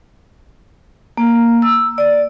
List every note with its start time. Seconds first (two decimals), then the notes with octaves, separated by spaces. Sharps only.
1.17 A#3
1.62 E6
1.98 D5